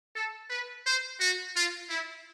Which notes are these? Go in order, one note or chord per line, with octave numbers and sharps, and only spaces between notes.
A4
B4
C5
F#4
F4
E4